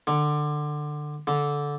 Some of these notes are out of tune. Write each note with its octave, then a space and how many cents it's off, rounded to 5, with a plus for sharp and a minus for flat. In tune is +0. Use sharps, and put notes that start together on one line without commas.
D3 +20
D3 -15